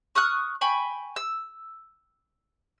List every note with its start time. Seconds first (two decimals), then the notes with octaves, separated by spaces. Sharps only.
0.15 C#6 D#6 F6 F#6
0.61 G5 G#5 B5 C#6
1.16 E6